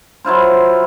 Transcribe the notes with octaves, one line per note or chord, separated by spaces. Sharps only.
F#3 E4 F4 C5